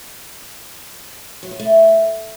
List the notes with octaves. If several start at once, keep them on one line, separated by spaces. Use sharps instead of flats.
F#3
B3
A3